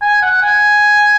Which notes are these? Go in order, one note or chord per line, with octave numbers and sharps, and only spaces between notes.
G#5
F#5
G#5